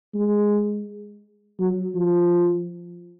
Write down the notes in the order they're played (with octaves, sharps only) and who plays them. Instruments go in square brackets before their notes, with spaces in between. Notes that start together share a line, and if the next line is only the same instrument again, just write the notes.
[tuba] G#3
F#3
F3